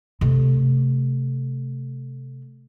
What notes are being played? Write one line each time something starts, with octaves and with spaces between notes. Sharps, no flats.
C3 A3